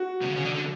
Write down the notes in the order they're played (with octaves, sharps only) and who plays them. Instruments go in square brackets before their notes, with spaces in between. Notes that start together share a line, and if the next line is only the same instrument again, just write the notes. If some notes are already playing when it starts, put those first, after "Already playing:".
Already playing: [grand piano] F#4
[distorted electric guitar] C3
C#3
C#3
D3
D3